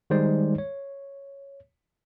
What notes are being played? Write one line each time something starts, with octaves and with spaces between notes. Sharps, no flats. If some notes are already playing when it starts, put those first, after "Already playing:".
D#3 G3 G#3 D#4 C5 D5
C#5